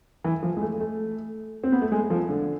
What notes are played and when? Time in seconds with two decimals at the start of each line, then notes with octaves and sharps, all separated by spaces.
0.24 E3
0.43 F3
0.57 G#3
0.62 A3
0.80 A3
1.64 C4
1.72 B3
1.82 A3
1.92 G#3
2.10 F3
2.29 D3